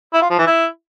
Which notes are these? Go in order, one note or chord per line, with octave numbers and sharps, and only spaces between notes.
E4
F4
F3
E3
E4